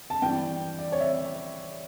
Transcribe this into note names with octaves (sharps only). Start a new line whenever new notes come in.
A5
G2 E3 G3 G5
D5
C#5
E5